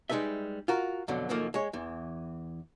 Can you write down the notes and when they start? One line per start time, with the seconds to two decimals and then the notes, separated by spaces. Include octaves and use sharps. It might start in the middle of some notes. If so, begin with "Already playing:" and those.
0.10 G3 G#3 D#4 A4 B4 E5
0.68 F4 F#4 A#4
1.08 F2 B2 D3 F#3
1.29 C#2 F#2 D#3 F3 A3 A#3
1.54 G#3 C#5
1.73 E2 E3